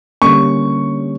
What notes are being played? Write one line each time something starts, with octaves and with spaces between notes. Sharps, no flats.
D3 G3 A#3 C#4 C#6